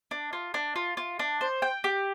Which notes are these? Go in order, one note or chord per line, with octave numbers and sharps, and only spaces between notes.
D4
F4
D4
F4
F4
D4
C5
G5
G4